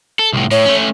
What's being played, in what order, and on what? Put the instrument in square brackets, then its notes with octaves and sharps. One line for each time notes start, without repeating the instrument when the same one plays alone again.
[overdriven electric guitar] A4
C2 A2
[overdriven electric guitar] A2 [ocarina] C#5
[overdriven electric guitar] A3 C#4